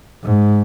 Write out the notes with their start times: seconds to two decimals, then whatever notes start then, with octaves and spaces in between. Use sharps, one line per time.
0.24 G#2